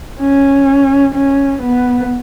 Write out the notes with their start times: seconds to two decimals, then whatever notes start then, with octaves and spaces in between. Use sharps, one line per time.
0.20 C#4
1.15 C#4
1.62 B3